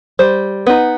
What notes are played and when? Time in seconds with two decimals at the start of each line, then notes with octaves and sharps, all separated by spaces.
0.19 G3 C5
0.67 B3 D#4